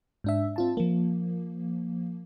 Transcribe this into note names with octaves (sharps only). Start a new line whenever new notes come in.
G#2 D4 E5
C4 F4 A5
F3 A#3